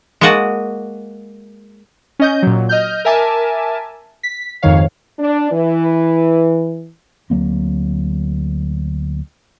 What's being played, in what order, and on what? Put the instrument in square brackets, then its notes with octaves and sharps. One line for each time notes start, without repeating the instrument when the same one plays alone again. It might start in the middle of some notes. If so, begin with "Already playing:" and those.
[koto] G#3 A#3 F#4 D#5 F#5 A5
[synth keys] C#4 D#5 G6
A#2 F#3
D#5 F6 G6
A#4 E5 G#5 A5 D6
B6
F2 G#2 D#3 C#5 F5
[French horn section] D4
E3
[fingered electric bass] D2 F#3 A#3 C4